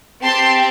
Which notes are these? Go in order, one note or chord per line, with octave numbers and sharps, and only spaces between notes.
C4 G4 A5 C6